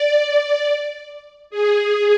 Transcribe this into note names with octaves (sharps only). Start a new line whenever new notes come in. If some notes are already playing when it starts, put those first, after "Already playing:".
Already playing: D5
D5
G#4